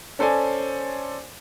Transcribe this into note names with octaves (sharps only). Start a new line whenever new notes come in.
C#4 A4 C5 D5 G#5